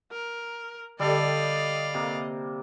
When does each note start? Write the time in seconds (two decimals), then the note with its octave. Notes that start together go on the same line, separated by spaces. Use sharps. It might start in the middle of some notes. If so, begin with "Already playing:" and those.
0.12 A#4
1.00 D3 G3 G4 A4 D5 D#5 F5 G5
1.94 C3 A#3